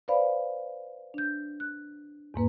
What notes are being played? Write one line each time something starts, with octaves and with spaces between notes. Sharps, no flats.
B4 C5 D5 F5 B5
D4 G6
F#6
E2 G#2 A#3 B4